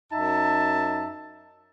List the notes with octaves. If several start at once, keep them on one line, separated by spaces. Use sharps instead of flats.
F#2 D#4 E5 A5